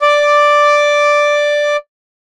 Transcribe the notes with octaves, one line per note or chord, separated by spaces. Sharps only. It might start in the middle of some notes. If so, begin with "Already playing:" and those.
D5 D6